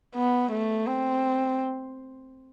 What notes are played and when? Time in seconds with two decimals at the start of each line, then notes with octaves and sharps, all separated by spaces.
0.15 B3
0.51 A3
0.87 C4